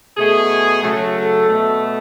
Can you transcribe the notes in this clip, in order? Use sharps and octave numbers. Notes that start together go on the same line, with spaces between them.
B2 A3 G#4
C#3 F#3 A3
A4
B2 A3